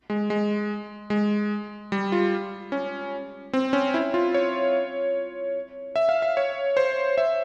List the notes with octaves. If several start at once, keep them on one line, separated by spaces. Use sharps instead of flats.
G#3
G#3
G#3
G3
F4
C#4
C4
C#4
E4
F4
C#5
E5
F5
E5
C#5
C5
E5